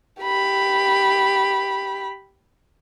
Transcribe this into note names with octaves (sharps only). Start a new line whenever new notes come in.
G4 B5